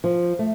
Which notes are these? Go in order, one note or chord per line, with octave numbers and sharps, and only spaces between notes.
F3
A3